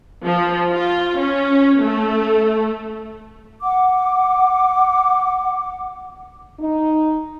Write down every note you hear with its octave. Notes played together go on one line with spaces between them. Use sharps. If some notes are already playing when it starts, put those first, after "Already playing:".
F3
F4
C#4
A3
F#5 D6
D#4